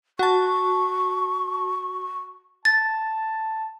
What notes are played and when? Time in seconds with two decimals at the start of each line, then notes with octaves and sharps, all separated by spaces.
0.19 F#4 A5 C#6
2.65 A5 A6